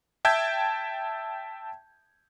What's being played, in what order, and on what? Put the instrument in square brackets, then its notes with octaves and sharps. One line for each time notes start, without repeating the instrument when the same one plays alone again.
[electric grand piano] E5 G5 A5 G6 G#6